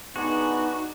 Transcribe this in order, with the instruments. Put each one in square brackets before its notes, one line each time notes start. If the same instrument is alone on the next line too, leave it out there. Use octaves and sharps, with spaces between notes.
[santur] G#3 D4 G#5 [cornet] B3 [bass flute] D#4 [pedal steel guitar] F#4